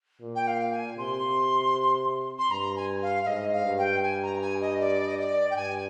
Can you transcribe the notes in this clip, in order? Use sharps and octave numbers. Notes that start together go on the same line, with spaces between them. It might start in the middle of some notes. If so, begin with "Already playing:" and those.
A#2
G5
F5
G#5
C3 C6
C6
G2 A#5
G#5
F5
F5
G#2 D#5
F5
G2
G5
G#5
A#5
G#5
D#5
D5
D#5
D5
G5
G2 G#5